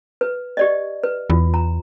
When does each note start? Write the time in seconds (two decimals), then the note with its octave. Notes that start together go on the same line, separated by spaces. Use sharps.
0.21 B4
0.57 G4 D5 D#5
1.04 B4
1.30 E2 F4
1.54 A#5